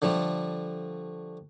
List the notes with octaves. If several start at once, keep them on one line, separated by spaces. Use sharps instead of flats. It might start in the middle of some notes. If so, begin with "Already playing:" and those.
D3 F3 G3 A3